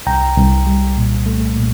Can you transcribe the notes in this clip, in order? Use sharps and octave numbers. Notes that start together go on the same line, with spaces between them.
C2 G5 A#5
C2
G3
A#2
A3
A#2